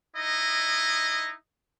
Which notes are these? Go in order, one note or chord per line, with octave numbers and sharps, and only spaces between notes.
D#4 E4 D#5